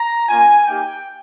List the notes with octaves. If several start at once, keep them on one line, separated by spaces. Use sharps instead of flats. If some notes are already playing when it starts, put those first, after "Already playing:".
Already playing: A#5
A#3 C#4 F4 G#5
A#3 D#4 G4 G5